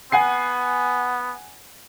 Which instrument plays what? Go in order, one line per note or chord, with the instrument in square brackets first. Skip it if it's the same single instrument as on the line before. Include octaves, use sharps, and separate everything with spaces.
[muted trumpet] B3 [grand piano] F#5 G#5 C7